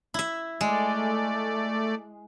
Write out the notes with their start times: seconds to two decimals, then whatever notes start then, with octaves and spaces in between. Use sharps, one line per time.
0.14 E4 E5
0.61 G#3 A3 D5